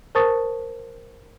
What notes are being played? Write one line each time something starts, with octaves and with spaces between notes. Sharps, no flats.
A#4 C5 A5 C#6 D#6 A6